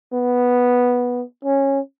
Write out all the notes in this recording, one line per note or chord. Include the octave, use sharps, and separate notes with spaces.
B3
C#4